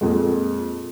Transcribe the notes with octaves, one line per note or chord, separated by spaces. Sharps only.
F2 A#2 G#3